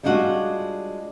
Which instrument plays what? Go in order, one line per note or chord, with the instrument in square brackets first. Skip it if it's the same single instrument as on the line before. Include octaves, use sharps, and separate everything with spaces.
[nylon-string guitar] G3 G#3 D4 F4 F#4